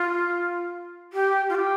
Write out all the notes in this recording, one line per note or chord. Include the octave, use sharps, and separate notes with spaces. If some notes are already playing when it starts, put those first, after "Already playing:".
Already playing: F4
G4
F4
G4